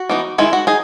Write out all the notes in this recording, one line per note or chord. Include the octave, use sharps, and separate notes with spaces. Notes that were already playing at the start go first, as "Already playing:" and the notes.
Already playing: F#4
E3 B3 D#4
D#3 G#3 D#4 E4
F#4
D#4 G#4